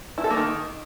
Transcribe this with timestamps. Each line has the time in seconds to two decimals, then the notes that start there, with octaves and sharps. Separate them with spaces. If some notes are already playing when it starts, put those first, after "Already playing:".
0.18 E4
0.24 A4
0.31 A#3
0.37 D#3